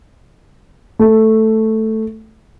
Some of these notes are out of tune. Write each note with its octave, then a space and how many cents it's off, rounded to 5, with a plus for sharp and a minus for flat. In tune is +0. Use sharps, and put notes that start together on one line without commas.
A3 +0